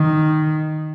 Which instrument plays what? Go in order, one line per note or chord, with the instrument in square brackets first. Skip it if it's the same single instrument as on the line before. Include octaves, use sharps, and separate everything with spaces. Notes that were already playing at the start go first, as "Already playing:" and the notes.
Already playing: [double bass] D#3